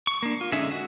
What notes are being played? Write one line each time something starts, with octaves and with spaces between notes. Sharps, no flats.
C#6
A#3 D4
F4
D3 G#3 C#4 D#4 E5
F#4